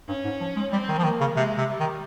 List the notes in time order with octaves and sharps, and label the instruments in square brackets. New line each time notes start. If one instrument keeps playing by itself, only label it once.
[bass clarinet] G2 [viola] C#4
[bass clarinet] G#2
F3
G#3
[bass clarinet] G3 [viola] C4
[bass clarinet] D#3
F3
[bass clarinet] D#3 [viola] A#3
[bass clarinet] C#3
[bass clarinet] C3 [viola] G#3
[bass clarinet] C3
[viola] G3
[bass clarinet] D#3